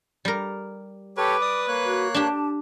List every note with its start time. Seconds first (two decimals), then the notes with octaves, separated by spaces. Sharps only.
0.25 G3 A#4
1.17 G4 A4 B4 C#5 D6
1.41 D5 D#6
1.68 A#3 C#5 F#6
1.85 F#4
2.14 D4 G4 A5